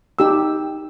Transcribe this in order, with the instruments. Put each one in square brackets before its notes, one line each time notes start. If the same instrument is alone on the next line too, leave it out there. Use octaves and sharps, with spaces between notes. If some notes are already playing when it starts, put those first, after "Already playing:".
[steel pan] D#4 G4 E6